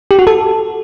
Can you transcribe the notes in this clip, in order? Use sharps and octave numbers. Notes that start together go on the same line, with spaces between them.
G4
F#4
A4